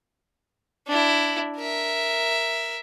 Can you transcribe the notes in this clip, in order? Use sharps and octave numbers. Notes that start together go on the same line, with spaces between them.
D4 E4
A#4 E5